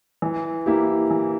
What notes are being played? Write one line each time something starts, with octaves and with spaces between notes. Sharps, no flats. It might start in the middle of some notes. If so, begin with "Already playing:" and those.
E3
A#3 E4 G4
E3